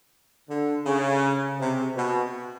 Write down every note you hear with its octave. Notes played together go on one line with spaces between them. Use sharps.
D3
C#3
C3
B2